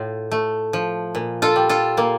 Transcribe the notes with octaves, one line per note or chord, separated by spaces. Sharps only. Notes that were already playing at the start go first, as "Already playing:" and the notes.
Already playing: A2 F4
A3
F3
A#2
F4 A4
G3
F4 A4
A#2 A#3